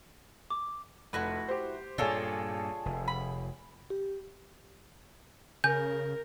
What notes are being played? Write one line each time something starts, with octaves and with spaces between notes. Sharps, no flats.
D6
F1 E4 F#4 B4
G4 C5
G2 A#2 F4 G#4 A4 C#5 D5
F1
B5
G4
C#3 A#4 G#5 G6